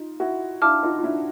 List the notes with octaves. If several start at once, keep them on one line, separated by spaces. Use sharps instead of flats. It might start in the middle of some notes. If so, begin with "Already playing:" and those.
Already playing: D#4 F4
E4 F#4
D4 E4 F5 A5 D6 F6
D#4 F4
F4
D4 E4